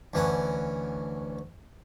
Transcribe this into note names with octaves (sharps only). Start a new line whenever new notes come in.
D2 E3 C#4 F#5